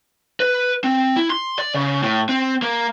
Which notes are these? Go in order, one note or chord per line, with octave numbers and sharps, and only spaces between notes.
B4
C4
E4
C6
D5
C#3
A2
C4
A#3